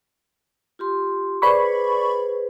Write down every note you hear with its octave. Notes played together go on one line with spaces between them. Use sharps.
F4 G4 C6
G#4 B4 C5 D5 B5 C#6